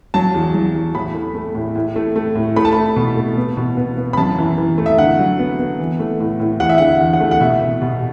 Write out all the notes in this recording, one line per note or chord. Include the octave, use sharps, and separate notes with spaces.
F#3 A5
E2
F#3
E2
A2 B5
A3
A3
A2
A2
A3
A3
A2
A3 B5
A5
A3 B5
B2
A3
B3
B2
B3
B3
B5
F#2 A5
E3
E3
A3
E5
D3 F#5
F#3
B3
B3
E3
A3
A2
A2
E2 F#5
E5
D3 F#5
E2
F#5
A3
F#5
B2 E5
B2
B2